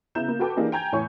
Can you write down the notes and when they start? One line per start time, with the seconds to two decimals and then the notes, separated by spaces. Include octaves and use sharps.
0.15 C#3 B3 E4 A#5 G6 E7
0.28 A#3
0.39 F#4 A4 B4 G5 A5 D6
0.56 E3 A#3 D4 D#4 G4 G#4
0.72 G5 G#5 A#5 G6 G#6
0.92 E2 A2 C#5 G#5 C#6